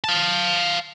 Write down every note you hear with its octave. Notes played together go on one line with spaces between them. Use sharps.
F5 A5